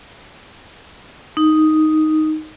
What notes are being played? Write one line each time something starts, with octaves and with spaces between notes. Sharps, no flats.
D#4